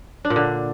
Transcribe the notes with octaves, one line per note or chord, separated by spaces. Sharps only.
D4
A#2
D3